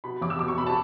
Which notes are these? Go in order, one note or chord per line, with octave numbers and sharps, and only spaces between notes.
B2 B5
E2 D6
E6
B2 D6
C#6
B2 B5
A5